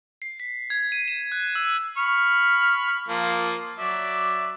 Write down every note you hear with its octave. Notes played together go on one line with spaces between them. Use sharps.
C7
B6
G#6
D#7
E7
F#6
E6
B5 C#6 F6
F3 A#3
F#3 D5 E5